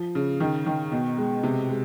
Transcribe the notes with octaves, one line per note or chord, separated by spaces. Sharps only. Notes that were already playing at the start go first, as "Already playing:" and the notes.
Already playing: F3
C#3
D#3
D#3
B2
G#3
C3
G#3